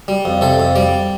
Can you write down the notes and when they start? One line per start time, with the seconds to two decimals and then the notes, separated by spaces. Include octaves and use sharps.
0.08 G3
0.25 F2
0.41 C3 A4
0.60 F2
0.76 G3 D5